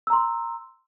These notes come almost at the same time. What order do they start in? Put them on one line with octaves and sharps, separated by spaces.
E6 A#5 C6